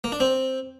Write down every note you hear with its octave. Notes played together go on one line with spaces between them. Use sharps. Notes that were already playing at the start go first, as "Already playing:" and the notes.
A#3
D4
C4